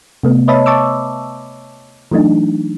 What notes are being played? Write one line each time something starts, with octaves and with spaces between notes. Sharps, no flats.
C3 A3 B3
B4 C#5 D#5 E5 A5 B5
A5 C#6 D6 E6
E3 F#3 A3 D4 D#4